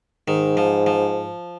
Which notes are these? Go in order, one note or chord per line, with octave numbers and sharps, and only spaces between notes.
G#2 D#3
F3
F3